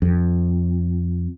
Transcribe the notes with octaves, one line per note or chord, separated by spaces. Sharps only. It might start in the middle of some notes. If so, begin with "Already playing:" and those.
F2